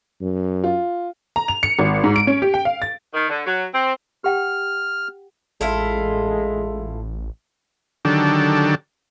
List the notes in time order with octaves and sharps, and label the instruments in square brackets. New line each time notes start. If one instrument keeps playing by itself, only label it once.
[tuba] F#2
[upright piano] F4
[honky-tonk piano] A#5
F7
C#7
G#1
G#2
D7
C#4
G4
G5
F5
A6
[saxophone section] D#3
D3
F#3
C4
[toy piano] G4 F#5 G5 [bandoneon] F6
[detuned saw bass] A1 [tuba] G#3 [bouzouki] E4 F4 A4
[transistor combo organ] D3 D#3 F#3 D4 G4 A4